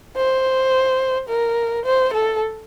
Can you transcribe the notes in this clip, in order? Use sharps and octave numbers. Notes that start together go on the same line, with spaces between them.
C5
A#4
C5
A4